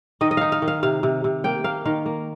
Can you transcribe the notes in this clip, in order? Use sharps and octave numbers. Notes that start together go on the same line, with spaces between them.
D#3 D#5
D#5
D#4 F5
F5
D#3
F5
C3 F5
C3
C3
A#3 G5
A#3 F5
D#3 F5
A#3